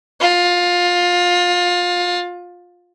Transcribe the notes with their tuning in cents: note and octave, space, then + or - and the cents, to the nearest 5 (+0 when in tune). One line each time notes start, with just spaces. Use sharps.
F4 +20